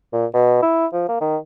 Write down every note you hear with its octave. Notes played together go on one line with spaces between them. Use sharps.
A#2
B2
E4
F3
A#3
D#3